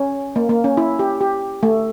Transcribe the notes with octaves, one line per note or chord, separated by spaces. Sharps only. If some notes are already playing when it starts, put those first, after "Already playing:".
Already playing: C#4
A#3
A#3
C#4
E4
G4
G4
A3